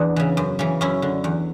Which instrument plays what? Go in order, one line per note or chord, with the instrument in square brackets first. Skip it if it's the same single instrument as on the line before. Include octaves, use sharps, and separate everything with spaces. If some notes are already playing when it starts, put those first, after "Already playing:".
Already playing: [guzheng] E2 B3 D4
C#3 E3
F#2
C#3 E3
F#2 C#4 E4
D3
E2